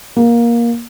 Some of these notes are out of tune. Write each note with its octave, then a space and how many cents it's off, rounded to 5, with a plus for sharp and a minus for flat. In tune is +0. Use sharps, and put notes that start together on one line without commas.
A#3 +15